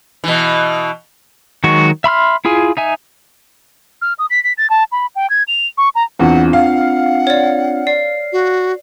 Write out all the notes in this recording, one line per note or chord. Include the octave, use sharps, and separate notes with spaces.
B2 E3
D#3 F#3 G#3 F#4 C#6
E5 B5 C6 F6
E4 F4 G#4 G#5
D#4 E5 G#5
F6
D#6
B6
B6
A6
A5
B5
G5
G#6
F7
C#6
A#5
E2 C4 D4 F4 F#5
F5 F#5
C#5 D5
D5 C7
F#4